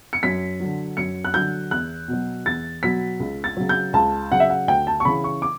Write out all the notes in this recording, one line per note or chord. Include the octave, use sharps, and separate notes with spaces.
C#7
F#2 B6
D3 F#3
F#2 C#7
F#6
D3 F#3 G6
E2 F#6
B2
F#3
E2 A6
B2 F#3 B6
C#2
A6
C#3 F#3
G6
C#2 A5
C#3 F#3 F#5
E5
F#5
D2 G5
A5
C#6
C#3 E3 B5
C#6
D6